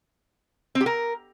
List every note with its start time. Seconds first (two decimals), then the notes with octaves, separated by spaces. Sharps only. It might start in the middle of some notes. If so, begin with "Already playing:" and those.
0.75 C4
0.81 G4
0.86 A#4